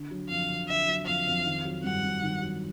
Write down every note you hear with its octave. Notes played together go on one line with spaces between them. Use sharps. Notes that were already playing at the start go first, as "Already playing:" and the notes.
Already playing: D3
F#3
F2 F5
F2
D3 E5
F#3
F2 F5
F2
D#3
F#3
G2 F#5
G2
D#3
F#3